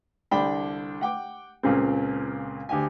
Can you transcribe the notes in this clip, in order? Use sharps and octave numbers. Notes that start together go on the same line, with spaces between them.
C2 D3 D4 G5 B5
F#5 G5 D6
C#2 A#2 C#3 C4
D2 G4 G#5